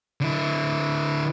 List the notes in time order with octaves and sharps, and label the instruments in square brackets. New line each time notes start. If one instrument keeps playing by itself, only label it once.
[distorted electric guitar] D3 E4